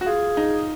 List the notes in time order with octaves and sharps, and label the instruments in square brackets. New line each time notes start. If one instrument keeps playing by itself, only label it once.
[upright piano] F#4
[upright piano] F4 [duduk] G#4
[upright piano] D#4